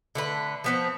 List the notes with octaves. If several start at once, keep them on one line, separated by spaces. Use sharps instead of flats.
D3 A3 B4
F3 B3 C4